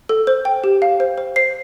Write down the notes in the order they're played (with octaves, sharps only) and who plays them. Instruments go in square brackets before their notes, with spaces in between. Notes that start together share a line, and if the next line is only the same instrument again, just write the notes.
[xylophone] A4
C5
G5
G4
F5
C5
C5
C5 C7